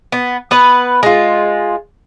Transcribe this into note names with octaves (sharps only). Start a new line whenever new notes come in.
B3
B3 B4
G#3 F4